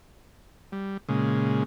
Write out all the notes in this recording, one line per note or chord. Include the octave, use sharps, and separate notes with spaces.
G3
A#2 C#3 G#3